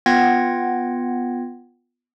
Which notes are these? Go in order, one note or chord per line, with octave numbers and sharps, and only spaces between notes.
B3 F4 F#5 G5 G#6 A#6